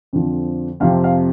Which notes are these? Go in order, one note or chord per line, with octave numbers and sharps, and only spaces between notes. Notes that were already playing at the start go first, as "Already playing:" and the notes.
F2 D3 F3
F2 C3 F3 F5
F5